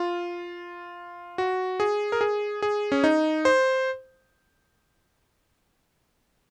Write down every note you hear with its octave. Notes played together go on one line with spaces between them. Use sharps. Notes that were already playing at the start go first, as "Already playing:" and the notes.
Already playing: F4
F#4
G#4
A#4
G#4
G#4
C#4
D#4
C5